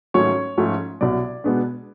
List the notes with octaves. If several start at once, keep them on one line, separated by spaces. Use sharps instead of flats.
G#2 D#3 F#3 A3 C#4 C#5
G#2 F3 A3 C#4
C2 B2 F#3 D5
B2 G#3 B3 D4